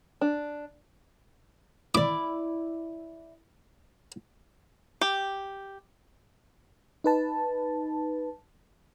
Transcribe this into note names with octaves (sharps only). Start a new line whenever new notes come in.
D4
E4 D5 D6
G4
D#4 B4 A5